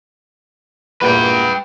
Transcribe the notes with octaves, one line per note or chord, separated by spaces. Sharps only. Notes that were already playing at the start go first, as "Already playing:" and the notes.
E2 G2 A#2 B4 G5